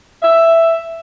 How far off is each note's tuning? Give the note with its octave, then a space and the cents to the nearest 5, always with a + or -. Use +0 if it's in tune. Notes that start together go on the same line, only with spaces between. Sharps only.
E5 +5